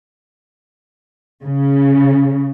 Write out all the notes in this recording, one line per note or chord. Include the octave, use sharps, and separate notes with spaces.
C#3